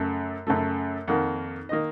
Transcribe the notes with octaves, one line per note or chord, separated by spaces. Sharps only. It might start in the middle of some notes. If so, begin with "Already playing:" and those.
Already playing: F#2 C#3 A3
F#2 C#3 A3
F2 D#3 A#3 F#5
D#3 A#3 D#5